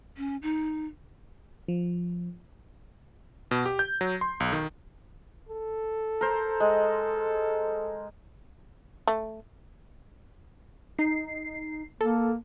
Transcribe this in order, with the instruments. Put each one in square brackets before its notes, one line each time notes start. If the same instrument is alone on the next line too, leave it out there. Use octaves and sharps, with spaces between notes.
[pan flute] C#4
D#4
[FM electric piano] F3
[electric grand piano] B2
G4
G6
F#3
C6
B1
D#3
[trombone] A4
[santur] A#4 C5
G#3
[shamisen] A3
[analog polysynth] D#4 C7
[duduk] A#3 [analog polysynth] A4